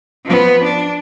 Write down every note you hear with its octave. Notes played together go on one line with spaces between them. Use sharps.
F3 B3
D4